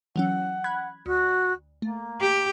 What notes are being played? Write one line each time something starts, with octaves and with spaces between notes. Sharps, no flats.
E3 F#3 C#4 F#5
B5 F#6 G#6
D2 F#4
A3 A#3
G4